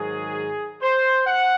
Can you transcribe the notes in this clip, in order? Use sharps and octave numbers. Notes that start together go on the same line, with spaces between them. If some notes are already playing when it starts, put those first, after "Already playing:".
Already playing: G#2 D#3 F#3 G#4
C5
F#5